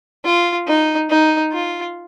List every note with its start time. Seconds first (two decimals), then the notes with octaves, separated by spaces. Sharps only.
0.25 F4
0.67 D#4
1.10 D#4
1.52 F4